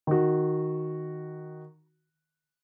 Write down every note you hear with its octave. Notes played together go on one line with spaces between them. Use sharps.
D#3 F#4